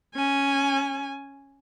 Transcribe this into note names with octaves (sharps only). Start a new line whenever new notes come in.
C#4 G#5